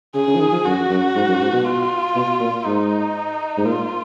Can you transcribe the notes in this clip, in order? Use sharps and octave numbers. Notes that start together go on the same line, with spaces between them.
C#3 G#4
C#3
F3
D#3
F3
F#2 F#4
F#2
G#2
F#2
G#2
B2
F4
B2
A#2
G#2 D#4
G#2
A#2 F4